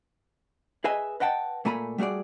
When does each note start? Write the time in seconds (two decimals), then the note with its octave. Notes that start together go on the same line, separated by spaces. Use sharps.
0.84 G#4 B4 D#5 E5 G#5
1.20 B4 D#5 F#5 G5 A5
1.65 A#2 A3 A#3 G#5 A#5 B5
1.98 G3 A3 F#4 G#4 D5